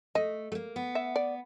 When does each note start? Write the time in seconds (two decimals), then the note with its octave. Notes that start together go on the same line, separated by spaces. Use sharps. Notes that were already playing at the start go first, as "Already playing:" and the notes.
0.15 A3 D#5
0.52 A3
0.55 A#3
0.76 B3
0.95 E5
1.16 D5